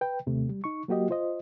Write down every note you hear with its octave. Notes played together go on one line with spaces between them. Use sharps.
B4 G5
D#2 C3 A3
G3
D#4 C#6
F#3 A#3 F#4 G4 D#5
F4 C5 D#5